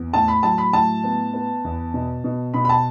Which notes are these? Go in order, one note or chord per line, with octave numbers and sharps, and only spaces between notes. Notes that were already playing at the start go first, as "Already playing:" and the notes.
Already playing: E2
A2 A5
B5
F#3 A5
B5
A2 A5
B3
B3
E2
B2
B2
B2 B5
B5
A5